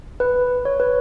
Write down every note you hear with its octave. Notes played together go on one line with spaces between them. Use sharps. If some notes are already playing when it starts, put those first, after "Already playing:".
B4
C#5
B4